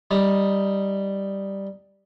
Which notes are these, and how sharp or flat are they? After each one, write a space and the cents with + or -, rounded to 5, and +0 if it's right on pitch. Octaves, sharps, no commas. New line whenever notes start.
G3 +0 D#4 +0